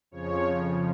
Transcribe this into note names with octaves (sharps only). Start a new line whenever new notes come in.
F2 C#3 F3 C#5